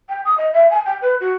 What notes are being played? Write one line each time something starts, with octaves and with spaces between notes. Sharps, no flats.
G5
D#6
D#5
E5
G#5
G5
B4
F#4